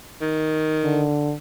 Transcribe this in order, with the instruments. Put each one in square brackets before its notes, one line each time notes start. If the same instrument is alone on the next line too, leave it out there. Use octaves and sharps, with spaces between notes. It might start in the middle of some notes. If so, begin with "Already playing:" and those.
[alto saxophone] D#3
[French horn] D3